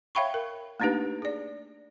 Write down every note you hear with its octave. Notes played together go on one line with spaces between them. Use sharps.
C#5 E5 F5 G5 B5 C#6
A#4
A3 A#3 D4 D#4 G4 B4
G#4 D5